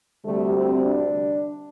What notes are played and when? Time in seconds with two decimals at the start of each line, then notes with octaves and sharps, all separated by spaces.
0.25 D2 C3 G3 A3
0.55 C4
0.85 D4